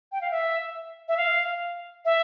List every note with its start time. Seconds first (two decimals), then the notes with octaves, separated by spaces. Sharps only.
0.12 G5
0.21 F5
0.31 E5
1.08 E5
1.17 F5
2.05 E5